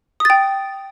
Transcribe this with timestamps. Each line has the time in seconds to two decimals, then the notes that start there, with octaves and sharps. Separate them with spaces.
0.20 D#6
0.25 A6
0.30 G5